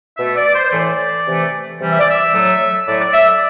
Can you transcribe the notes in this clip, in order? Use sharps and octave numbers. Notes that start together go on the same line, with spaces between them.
B2 A3 E5
D5
C5
C5
A2 E3 A3 D5
C3 E3 A3
C3 E3 G3
E5
D5
E5
A2 F#3 A3
A2 F#3 A3 D5
D5
E5
D5